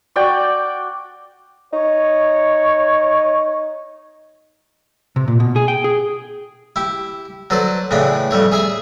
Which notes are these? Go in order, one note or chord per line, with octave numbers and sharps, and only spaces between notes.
F#4 D5 G5 C#6
D#4 C#5
C3
A#2
B2
G#4
G5
G#4
E4 G4
F#3 A4 B4 C5 D5
A2 C#3 E3 D4 B5
F2 G3 A3 C#5
G#4 E5 G#5